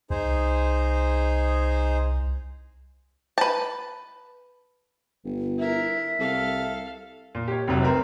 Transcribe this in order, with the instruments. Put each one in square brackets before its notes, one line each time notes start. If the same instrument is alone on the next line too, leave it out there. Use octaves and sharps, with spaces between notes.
[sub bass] C2 [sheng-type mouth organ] D#4 G#4 C5
[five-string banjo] B4 A5
[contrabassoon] G1
[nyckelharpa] E4 A#4 [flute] E5
[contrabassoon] C2 [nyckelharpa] A4 F5
[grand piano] A#2
G4 C#5
F1 C2 F#3
C4 A#4 B4